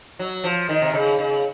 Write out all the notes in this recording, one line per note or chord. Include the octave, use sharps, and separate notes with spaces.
F#3
F3
D#3
C3
C#3
C#3